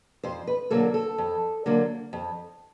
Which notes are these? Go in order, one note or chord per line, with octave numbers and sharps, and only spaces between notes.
F2 C5
B4
D3 F#3 A#3 A4
A4
F2
D3 F#3 A#3
F2